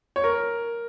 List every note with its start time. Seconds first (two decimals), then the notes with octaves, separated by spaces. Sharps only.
0.16 C#5
0.24 A#4